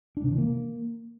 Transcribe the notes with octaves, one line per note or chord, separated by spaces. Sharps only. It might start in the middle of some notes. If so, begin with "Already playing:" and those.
D4
C3
E3
A#3